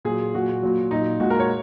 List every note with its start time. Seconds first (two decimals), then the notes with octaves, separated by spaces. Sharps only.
0.05 A#2 F#3 G#4
0.34 A#2 F#3 F#4
0.62 A#2 F#3
0.91 A#2 F#3 D#4
1.20 A#2 G#3 F#4
1.30 A#4
1.40 C#5